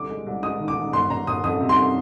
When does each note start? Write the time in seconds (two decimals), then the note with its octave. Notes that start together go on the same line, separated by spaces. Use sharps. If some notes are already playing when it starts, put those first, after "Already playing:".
Already playing: C2 D3 D6
0.09 G#3
0.26 C2
0.43 G#3 D#6
0.60 D#3
0.68 D6
0.76 D#3
0.93 G1 C6
1.10 G1 A#5
1.27 G1 D#6
1.44 F2 D#6
1.60 C3
1.69 C6